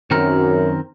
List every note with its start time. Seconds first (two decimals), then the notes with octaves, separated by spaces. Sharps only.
0.11 F#2 D#3 C4 A#4